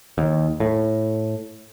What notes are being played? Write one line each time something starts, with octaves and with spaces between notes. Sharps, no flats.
D#2
A2